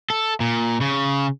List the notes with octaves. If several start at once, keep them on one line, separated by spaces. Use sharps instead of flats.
A4
A#2
C#3